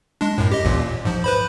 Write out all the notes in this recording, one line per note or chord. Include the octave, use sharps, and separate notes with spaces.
G#3 D4
F#2 A2
G4 D#5
A1 D#2 A#2
G#2 F3
B4 C5 B5